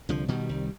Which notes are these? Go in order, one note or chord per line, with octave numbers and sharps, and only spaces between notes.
C2 D3 F3
B2 D#3 G3
C2